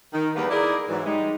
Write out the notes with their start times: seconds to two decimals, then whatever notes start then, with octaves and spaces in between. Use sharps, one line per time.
0.12 D#3
0.36 E2 G3 A#3 B3 B4 F5
0.50 D#4 E4 G#4 A#4 D5
0.88 G#2 E3 F#3
1.05 G3 G#3 D#4